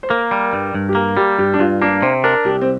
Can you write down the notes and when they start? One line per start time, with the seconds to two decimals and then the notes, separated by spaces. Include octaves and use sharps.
0.03 C5
0.10 A#3 A#4
0.31 G3
0.53 G2
0.74 G2
0.89 G4
0.95 A#3 A#4
1.17 G3 G4
1.38 G2 G4
1.54 D4
1.59 G2 F4
1.81 A#3 D4
2.02 C3 C5
2.24 D4 A#4
2.45 C2 G4
2.61 C4